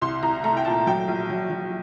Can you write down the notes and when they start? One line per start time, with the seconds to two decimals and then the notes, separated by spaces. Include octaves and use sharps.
0.02 C2 C6
0.23 C2 A#5
0.44 A3 A#5
0.57 G5
0.65 A#2 A5
0.86 F#3 G5
1.08 A#1
1.30 F#3
1.50 F#3